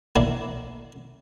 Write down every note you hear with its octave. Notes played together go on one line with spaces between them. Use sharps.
A#3 D4 E4